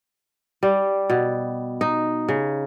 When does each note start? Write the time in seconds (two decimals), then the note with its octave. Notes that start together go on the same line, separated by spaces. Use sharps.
0.63 G3
1.10 B2
1.81 D#4
2.28 C#3